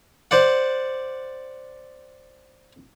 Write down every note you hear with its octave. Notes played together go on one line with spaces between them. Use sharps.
C5 D5 F#5